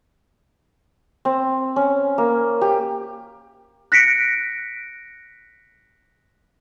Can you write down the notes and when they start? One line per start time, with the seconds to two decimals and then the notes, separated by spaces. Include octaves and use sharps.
1.25 C4
1.76 C#4
2.18 A#3
2.61 G4
3.92 F#6 A#6 B6 C#7 D7